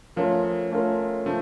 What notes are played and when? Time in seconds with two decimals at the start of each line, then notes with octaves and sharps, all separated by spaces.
0.16 F3 A3 C#4 F4 A#4
0.72 A3 C#4 F4 A#4
1.26 F3 A3